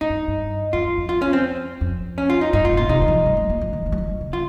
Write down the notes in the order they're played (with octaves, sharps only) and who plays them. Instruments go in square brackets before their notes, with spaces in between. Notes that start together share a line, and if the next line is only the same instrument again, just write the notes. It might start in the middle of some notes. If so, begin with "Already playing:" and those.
[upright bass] G#2 [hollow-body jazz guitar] D#4
[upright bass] G2
F2
G2
[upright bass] F2 [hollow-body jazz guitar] F4
[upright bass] F2
F2
[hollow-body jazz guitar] F4
C#4
C4
[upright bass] F2
[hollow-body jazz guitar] C#4
F4
D#4
[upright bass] G2 [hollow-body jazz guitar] D#4
[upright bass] G#2 [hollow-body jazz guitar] F4
[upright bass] C3
[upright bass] A#2 [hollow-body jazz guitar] F4
[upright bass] C3 [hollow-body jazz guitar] D#4
[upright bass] C#3
D#3
F3
G3
G#3
A#3
F3
D#3
D#3
G3
F3
D#3
C#3
[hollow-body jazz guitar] F4